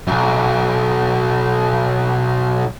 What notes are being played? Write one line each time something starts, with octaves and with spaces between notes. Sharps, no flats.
B1 F#2